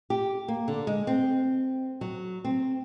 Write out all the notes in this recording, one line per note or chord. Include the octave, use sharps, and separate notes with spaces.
G4
A#3
D3
G#3
C4
F#3
C4